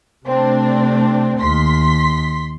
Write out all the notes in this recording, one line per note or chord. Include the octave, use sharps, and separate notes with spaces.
C3 A3 C4 D4
D#2 C6 B6